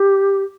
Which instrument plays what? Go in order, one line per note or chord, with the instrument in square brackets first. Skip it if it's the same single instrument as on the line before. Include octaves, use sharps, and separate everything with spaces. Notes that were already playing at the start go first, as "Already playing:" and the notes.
Already playing: [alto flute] G4